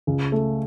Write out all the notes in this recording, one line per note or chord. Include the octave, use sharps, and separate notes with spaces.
C#2
A3